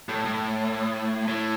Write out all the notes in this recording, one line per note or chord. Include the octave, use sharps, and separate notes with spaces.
A2
A2
A2